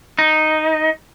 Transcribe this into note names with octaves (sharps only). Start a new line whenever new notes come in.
D#4